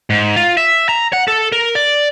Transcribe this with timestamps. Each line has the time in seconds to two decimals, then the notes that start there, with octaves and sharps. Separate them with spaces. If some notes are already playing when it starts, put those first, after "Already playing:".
0.10 G#2
0.36 F4
0.57 E5
0.89 A#5
1.13 F#5
1.28 A4
1.52 A#4
1.75 D5